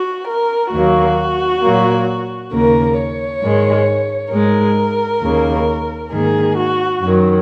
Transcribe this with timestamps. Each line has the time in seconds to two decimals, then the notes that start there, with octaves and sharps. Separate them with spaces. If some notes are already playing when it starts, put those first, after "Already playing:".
Already playing: F#4
0.27 A#4
0.72 D#2 D#3 F#3 A#3 F#4
1.62 A#2 F#3 A#3
2.52 D#2 C#3 A#3 A#4
2.97 C#5
3.42 G#2 D#3 G#3
4.32 G#2 G#3 A#4
5.22 D#2 C#3 A#3
6.12 G#2 D#3 A#3 G#4
6.57 F#4
7.02 F#2 D#3 F#3